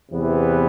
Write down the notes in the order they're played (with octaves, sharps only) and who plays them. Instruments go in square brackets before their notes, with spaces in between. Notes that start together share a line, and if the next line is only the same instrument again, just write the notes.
[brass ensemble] E2 C3 E3 B3